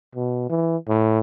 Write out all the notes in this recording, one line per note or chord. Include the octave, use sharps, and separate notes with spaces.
B2
E3
A2